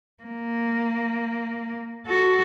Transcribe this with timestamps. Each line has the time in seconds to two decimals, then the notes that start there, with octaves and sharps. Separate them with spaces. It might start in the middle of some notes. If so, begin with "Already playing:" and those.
0.24 A#3
2.06 F#4 A4